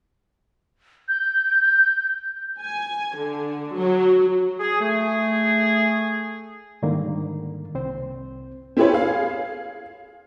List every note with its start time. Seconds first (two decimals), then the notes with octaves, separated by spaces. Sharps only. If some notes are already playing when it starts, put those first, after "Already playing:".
1.08 G6
2.62 G#5
3.18 D3
3.75 F#3
4.60 G#4
4.80 A3 G#4
6.82 G#2 D3 D#3 G3 A#3
7.75 C2 C4 C5
8.77 C4 E4 G4 G#4 B4 C#5
8.92 G#4 F5